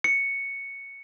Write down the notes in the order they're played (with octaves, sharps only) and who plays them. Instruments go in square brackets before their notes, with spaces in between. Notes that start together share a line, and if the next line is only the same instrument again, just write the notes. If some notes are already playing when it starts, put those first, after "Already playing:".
[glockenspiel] C#7